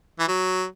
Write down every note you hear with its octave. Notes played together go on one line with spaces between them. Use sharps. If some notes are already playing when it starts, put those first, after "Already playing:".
E3
F#3